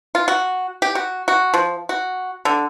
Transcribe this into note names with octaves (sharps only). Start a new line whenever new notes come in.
F4
F#4
G4
F#4
F#4
F3
F#4
D3